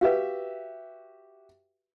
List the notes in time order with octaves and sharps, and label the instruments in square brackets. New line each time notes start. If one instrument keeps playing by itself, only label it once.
[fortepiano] F#4 G4 E5 [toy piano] B4 F5